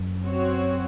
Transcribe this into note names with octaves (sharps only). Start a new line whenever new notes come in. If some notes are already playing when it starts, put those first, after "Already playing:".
Already playing: F#2
C4 F#4 C#5